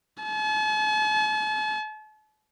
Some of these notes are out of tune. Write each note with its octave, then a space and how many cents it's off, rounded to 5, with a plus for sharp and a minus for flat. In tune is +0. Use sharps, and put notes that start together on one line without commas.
A5 -45